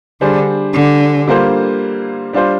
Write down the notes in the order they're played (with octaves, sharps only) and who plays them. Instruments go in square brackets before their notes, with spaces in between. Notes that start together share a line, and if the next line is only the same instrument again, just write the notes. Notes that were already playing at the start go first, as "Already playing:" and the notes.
[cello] D3 [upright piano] G3 D4 G#4 C5
[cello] D3
[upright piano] D3 G3 A#3 F4 C5
G3 D4 F4 C5